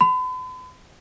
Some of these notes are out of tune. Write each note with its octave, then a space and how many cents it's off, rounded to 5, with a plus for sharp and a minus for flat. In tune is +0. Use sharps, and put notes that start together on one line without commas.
B5 +45